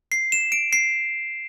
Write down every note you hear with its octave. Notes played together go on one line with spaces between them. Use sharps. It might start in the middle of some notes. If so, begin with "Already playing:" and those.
C7
E7
D7
C7